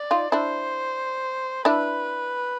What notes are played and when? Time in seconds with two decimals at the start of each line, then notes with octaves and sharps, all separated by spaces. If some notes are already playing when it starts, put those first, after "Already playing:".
Already playing: D5
0.11 D#4 F4
0.32 D4 E4 C5
1.65 D4 E4 B4